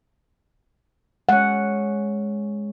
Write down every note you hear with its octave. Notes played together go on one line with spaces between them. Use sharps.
G#3 C#4 F#5